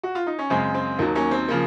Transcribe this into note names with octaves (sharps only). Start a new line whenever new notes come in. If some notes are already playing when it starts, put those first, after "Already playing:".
F#4
F4
D#4
C#4
F#2 C#3 G#3 C4
C4
D#2 D#3 F#3 A#3
A#3 C#4
C4
C#3 F3 A#3